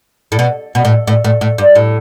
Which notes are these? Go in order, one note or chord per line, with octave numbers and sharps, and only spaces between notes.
A2
B2
B2
A2
A2
A2
A2
G2
A2